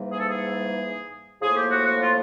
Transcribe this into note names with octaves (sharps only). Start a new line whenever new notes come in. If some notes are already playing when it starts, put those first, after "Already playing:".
Already playing: G#2 E3 G3 A#3
G#4
A4
G#4
A2 F3 A#3 G#4
G4
F#4
F#4
F4